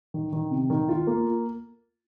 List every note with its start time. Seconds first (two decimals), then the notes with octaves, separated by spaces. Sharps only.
0.14 D#3
0.33 D#3
0.51 C3
0.70 D#3
0.88 F4
1.07 A#3